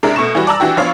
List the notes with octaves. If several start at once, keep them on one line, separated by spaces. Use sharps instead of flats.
C3 G#3 D4 E4 A#4
B2 A3 C#6 E7
E3 G3 F#4
D5 A5 A#5 E6
E3 D4 F#4 G4
F3 B3 D4 C#5 F5